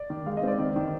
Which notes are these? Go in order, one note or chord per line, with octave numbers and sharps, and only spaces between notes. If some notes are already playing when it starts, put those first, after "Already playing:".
Already playing: D5
D#3
G#3 F5
D#5
C4 D5
D#3
D#3